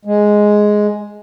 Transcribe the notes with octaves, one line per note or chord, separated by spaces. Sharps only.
G#3